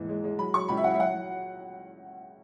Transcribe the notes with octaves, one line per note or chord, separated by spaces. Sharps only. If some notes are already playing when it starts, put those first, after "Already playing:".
Already playing: D#2 G#2 E3
G#3
G#3
F#3 B5
F#3 C#6
C#2 B5
E5
F#3 F#5
E5
F#3 F#5
F#3